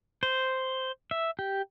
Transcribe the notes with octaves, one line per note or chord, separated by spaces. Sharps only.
C5
E5
G4